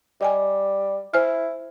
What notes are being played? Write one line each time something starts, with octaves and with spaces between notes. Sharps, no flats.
G3 D#5 G5 G#5
E4 C5 G#5 F6